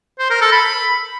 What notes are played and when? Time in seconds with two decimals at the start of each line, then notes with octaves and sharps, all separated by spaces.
0.19 C5
0.30 A#4
0.41 A4
0.52 B5